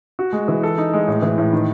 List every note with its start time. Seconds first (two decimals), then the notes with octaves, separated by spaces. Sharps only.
0.19 F#4
0.33 G#3
0.48 E3
0.63 A4
0.78 D#4
0.93 G#3
1.08 A2
1.22 E3
1.38 A2
1.53 D#3